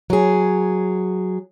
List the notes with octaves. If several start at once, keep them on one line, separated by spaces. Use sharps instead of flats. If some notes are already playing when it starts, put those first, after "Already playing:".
F#3 G#4